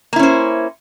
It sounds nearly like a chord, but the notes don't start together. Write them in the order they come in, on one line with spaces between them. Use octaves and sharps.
A#3 E4 C#4 C5